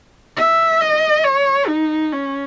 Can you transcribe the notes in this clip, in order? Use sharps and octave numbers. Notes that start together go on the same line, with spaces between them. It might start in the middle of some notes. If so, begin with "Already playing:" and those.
E5
D#5
C#5
D#4
C#4